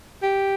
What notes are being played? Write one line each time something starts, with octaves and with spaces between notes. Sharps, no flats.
G4